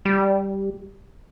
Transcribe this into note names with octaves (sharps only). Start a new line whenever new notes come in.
G3